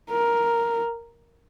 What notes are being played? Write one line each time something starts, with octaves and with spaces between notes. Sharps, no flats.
A#4